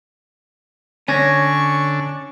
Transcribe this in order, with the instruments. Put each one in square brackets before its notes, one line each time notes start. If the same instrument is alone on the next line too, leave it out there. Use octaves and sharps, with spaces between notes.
[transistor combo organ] D3 D4 [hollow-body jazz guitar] C#4 [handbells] G#5 G#6 A#6 [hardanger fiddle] C#6